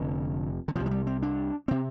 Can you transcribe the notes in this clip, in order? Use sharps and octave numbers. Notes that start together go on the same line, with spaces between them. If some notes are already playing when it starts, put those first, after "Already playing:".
Already playing: F1 F2 D3
D3
C2 C3 F3
F3
G3
C4
D4
C3 C4